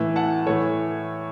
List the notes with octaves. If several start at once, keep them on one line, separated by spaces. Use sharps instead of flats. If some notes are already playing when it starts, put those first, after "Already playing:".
Already playing: A2 E3
F#5 A5
A2 E3 A4 C#5